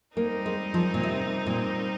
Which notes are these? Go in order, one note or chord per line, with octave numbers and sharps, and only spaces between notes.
G3 A#3 C4 D#4 A#4
G#3
F3
A#2
C3
A#2